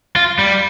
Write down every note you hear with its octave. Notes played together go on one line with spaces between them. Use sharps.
F4
G3